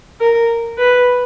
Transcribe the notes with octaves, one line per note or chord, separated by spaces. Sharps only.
A#4
B4